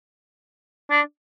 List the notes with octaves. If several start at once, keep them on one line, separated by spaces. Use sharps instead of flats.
D4